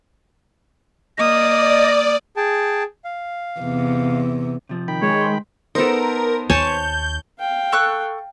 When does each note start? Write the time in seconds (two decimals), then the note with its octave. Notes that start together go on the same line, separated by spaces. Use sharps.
1.18 A#3 D5 D#5 D#6
2.37 G#4 G5 A5
3.05 F5
3.60 E2 C3
4.69 C3 F3 C4
4.88 D#3 G5 B5
5.02 G#3 C#5
5.21 C5 C6
5.75 B3 D#4 A4 A#4 C5
6.50 D#2 C#5 G#5 A5 G6
7.40 F5 G5
7.72 A4 C#6 F#6